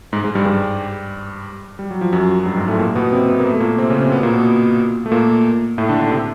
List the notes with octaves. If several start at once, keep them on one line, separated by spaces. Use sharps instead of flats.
G#2 G#3
G#2 G#3
G2 G3
G2 G3
G3
F#3
F3
F#2 F#3
F#3
G2 G3
G#2 G#3
A2 A3
A#2 A#3
B2 B3
C3 C4
B3
A#3
A3
A#2 A#3
C3 C4
C#3 C#4
C3 C4
B2 B3
A#2 A#3
B2 B3
A3
A#2 A#3
A2 A3
D3 D4
D3 D4
C3 C4